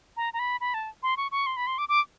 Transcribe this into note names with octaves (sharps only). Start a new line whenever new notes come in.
A#5
A#5
B5
B5
A5
C6
C#6
C#6
C6
B5
C6
D6
D6